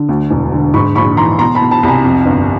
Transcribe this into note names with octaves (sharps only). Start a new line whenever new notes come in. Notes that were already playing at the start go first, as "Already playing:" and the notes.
Already playing: D3
D2
E1
D3
G#2 B5 C#6
A#1 B5 C#6
E3 A#5 C6
B2 A#5 C6
A5 B5
B2
A5 B5
C2 G#5 A#5 B5
F2
G1